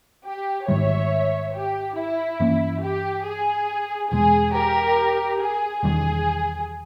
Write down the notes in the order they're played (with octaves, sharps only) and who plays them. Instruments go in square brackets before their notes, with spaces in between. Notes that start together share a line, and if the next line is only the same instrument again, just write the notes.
[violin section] G4
[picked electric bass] G#1 G#2 D#3 G3 [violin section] C#5 E5
[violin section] G4
E4
[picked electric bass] G2 E3 A#3 C#4
[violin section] G4
G#4
[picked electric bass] E2 B2 G#3 [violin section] G#4
[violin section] G4 A#4
G#4
[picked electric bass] E1 E2 D#3 G3 [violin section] G#4